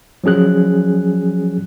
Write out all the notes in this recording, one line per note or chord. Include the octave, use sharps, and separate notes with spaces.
F3 F#3 C#4 G#4 F#6